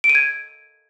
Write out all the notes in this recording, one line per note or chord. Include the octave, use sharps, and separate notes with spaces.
D7
D#7
G#6